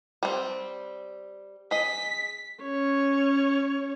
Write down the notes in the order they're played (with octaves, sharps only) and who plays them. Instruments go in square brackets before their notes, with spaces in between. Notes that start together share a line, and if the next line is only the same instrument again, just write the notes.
[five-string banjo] G3 C4
[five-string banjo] G#4 D#5 [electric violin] B6
[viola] C#4 C#5